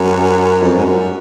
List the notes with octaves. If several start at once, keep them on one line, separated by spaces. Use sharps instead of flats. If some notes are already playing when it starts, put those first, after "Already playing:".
Already playing: F#2
F2
G#2
F#2